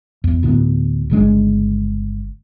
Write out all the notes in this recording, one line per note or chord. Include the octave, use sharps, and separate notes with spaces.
E2
D2 A2 F#3 B3
G1 C#3 G#3 D4